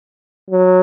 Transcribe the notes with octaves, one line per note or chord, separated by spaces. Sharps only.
F#3